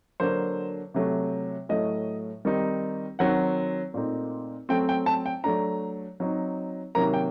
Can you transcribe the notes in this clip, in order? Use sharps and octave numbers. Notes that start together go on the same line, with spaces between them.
D3 F#3 A#3 D4 C5
C3 F#3 A3
A2 F#3 A3 D#5
D#3 G3 C4 D#4
D#3 F#3 C4 F#5
A#2 A3 C4 D#4
F#3 A3 C4 G5
G5
A5
G5
F#3 A3 D4 A#5
F#3 C4 D#4
C3 D#3 F#3 A#3 A#5
G5